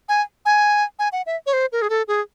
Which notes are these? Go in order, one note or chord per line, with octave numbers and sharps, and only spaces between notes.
G#5
G#5
G#5
F#5
E5
C#5
C5
A#4
G#4
A4
G#4